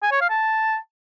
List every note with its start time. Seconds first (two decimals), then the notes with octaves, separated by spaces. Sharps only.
0.03 G#5
0.12 C#5
0.21 F5
0.30 A5